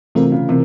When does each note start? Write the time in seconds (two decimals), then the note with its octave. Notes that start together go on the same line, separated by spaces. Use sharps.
0.15 C3 E3 A3 C4 F4 A#4
0.32 C#3
0.49 C3 E3